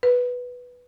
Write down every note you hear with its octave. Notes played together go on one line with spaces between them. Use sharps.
B4